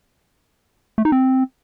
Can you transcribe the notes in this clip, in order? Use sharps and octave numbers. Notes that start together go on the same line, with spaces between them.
A3
D#4
C4